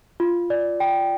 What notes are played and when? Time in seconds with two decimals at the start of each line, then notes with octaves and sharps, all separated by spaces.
0.20 F4
0.50 D5
0.80 G5